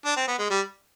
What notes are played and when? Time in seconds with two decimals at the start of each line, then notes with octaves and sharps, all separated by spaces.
0.05 D4
0.16 C4
0.27 B3
0.39 G#3
0.50 G3